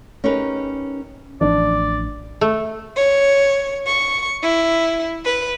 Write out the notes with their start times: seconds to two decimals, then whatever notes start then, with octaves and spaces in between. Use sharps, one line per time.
0.24 C#4 D#4 G4 G#4 A#4 B4
1.41 A1 E3 F3 D4 D5
2.41 A3
2.97 C#5
3.86 C#6
4.41 E4
5.25 B4